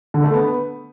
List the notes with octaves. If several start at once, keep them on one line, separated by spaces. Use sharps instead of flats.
D3
A3
B3